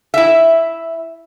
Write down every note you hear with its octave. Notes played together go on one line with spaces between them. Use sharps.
E4 E5